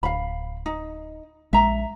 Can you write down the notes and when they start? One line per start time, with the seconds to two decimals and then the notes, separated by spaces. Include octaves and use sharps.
0.03 D1 F5 B5
0.66 D#4
1.53 A#1 G#3 E5 A#5